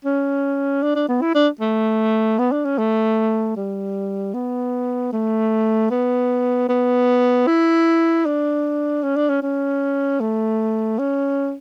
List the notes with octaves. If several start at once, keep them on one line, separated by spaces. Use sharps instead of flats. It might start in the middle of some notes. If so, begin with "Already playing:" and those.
C#4
D4
D4
B3
E4
D4
A3
B3
D4
C#4
A3
G3
B3
A3
B3
B3
E4
D4
C#4
D4
C#4
C#4
A3
C#4